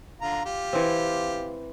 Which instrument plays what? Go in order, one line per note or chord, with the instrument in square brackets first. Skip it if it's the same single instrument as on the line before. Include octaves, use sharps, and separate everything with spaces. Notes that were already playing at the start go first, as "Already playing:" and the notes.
[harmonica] D3 F4 A#5
F4 G4
[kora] E3 C4